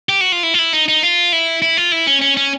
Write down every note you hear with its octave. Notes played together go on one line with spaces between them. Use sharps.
G4
F#4
F4
E4
F4
E4
D#4
D#4
F4
E4
E4
F4
E4
C#4
C#4
C#4